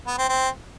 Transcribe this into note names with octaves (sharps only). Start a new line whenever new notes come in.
B3
C4
C4